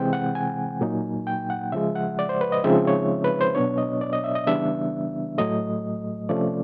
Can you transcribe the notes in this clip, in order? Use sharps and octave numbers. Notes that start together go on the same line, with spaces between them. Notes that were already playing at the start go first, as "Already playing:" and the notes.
Already playing: C3 E3 G#3 C4 G5
F#5
G#5
A#2 F#3 A#3 D#4
G5
F#5
C#3 F3 G#3 E5
F#5
D5
C5
B4
D#5
C#3 F3 G#3 C4 D#4 E5
C#5
B4
C5
B2 F#3 B3 D4 C#5
D#5
D5
D#5
E5
D#5
C#3 E3 G3 B3 D4 E5
A2 F#3 A3 D#5
C3 F3 A3 C#4 D5